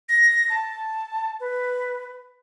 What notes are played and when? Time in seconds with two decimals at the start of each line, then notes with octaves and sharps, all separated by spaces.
0.09 A#6
0.50 A5
1.40 B4